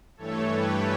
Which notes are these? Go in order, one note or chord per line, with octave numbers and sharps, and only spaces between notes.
G2 E3 A3 A4 C#5
G4 B4